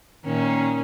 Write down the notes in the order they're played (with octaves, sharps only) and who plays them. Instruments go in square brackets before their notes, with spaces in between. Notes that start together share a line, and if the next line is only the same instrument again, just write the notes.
[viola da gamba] A#2 D#3 C#4